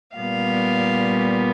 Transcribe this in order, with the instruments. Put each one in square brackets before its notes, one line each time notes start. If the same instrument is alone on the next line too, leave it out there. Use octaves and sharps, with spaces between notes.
[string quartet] A#2 G3 B3 F5